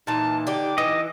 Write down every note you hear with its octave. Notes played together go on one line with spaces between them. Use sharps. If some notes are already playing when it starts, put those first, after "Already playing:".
A#2 E3 D#4 A5
D3 G4 D6
E3 D#5